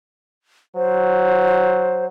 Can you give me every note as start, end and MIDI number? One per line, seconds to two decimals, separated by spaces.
0.76 2.08 54
0.76 2.05 72